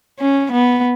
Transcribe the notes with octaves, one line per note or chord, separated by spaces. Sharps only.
C#4
B3